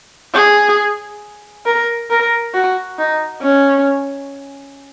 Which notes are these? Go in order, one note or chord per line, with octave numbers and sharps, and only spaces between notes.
G#4
A#4
A#4
F#4
D#4
C#4